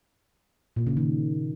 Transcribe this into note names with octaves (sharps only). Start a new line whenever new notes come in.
A#2
C#3
D#3